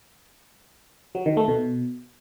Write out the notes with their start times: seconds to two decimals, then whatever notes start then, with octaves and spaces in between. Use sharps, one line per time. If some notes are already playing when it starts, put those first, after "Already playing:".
1.15 F#3
1.26 D#3
1.37 A3
1.48 B2